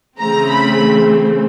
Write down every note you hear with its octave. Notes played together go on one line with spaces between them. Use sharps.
C#3 E3 A3 C4 A#5
B5